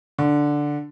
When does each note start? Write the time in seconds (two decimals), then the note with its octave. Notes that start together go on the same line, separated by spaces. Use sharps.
0.18 D3